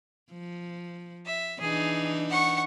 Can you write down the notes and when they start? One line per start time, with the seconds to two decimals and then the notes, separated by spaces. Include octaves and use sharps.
0.31 F3
1.26 E5
1.60 E3 D4 D#4 G#4
2.29 F#5 C#6